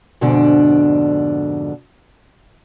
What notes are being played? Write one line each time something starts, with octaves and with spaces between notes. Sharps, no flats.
F2 G#2 B2 D3 D4